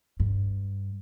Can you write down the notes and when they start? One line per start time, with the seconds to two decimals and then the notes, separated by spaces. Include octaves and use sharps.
0.20 G2